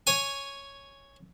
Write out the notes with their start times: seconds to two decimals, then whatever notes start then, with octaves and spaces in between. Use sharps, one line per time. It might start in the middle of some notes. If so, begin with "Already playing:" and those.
0.07 C#5 G#5